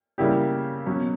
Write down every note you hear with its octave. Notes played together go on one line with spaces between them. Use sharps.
C#3 G3 A#3 E4 G4
B2 F#3 C#4